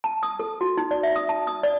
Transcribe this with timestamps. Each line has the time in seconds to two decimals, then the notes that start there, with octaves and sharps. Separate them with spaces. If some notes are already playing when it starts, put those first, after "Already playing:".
0.04 A5
0.23 D#6
0.39 A4
0.61 F#4
0.77 D#4
0.91 D5
1.03 E5
1.16 D#6
1.29 A5
1.47 D#6
1.63 D5